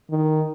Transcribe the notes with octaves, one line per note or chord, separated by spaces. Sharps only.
D#3